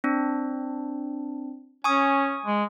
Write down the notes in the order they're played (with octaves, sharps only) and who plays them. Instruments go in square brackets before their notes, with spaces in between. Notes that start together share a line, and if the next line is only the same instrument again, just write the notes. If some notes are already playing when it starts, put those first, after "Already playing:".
[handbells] C4 D4
[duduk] C#4 [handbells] G#5 C#6 D#6
[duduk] G#3